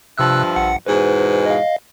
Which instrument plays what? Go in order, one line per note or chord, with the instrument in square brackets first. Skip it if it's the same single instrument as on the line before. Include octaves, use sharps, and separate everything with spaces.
[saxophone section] G2 F3 E5 [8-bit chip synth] C3 E6 F#6
[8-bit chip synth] A#1 F#5 C#7
[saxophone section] E2 G#2 B2 [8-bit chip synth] B4 C5
[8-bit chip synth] D#5 F5